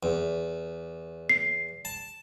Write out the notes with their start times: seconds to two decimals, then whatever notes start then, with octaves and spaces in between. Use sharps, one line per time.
0.03 E2
1.29 C7
1.85 A5